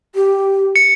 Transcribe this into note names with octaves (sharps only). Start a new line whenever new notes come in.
G4
C#7